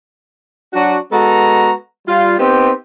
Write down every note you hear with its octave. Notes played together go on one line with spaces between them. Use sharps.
F#3 D4 F#4
G#3 B3 F#4 A4 A#5
G3 F4
B3 C4 D#4 G4